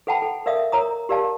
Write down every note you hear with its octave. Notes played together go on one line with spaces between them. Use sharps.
A4 B4 F#5 G5 A5 B5
A4
A#4 D5 E5 F5 D#6
A#4 C#5 A#5 D#6
G4 A#4 D5 F5 A5